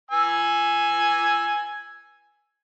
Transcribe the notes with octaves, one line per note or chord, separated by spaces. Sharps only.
G#5 E6